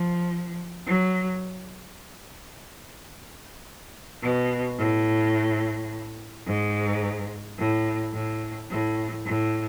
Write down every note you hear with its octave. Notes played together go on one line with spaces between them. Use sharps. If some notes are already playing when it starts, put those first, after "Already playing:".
Already playing: F3
F#3
B2
A2
G#2
A2
A2
A2
A2